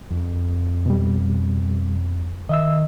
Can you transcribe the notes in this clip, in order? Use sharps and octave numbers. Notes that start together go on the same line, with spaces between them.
F2
B2 G3
D#3 D#5 E5 E6